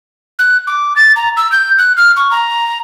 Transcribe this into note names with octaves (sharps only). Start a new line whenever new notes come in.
F#6
D6
A6
A#5
E6
G6
F#6
F6
C#6
A#5